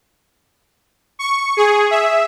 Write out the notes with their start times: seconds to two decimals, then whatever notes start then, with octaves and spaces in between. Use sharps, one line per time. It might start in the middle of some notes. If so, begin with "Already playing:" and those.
1.19 C#6
1.57 G#4
1.91 E5